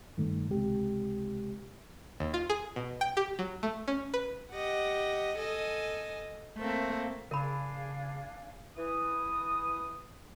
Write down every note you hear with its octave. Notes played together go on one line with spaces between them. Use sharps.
G2 D#3 A3
C#2 C3 G#3 G4
D#2
F4
G#4
B2
G5
G4
F#3
A3
C#4
B4
G4 D#5 F#5
A4 D#5 G#5
A3 A#3 C4
C#3 D4 A#4 F5 G#5 B5
E3 D#6